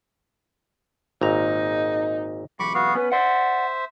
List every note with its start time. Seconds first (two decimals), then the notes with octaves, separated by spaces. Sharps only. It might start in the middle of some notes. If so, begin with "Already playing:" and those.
1.21 G#1 A#2 D#4 A#5
2.59 B1 E2 B5 C#6 D6
2.74 B3 F#4 F5
2.95 B3 C#4 B4
3.12 C5 D5 E5 F#5